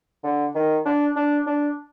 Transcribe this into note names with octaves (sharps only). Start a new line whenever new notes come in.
D3
D#3
D4
D4
D4